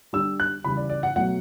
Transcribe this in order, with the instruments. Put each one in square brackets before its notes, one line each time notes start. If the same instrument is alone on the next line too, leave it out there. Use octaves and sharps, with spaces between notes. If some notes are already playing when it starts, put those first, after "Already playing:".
[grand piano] D3 G3 E6
F#6
C#3 E3 G3 B5
D5
D5
F#5
B2 F#3 A3 F#5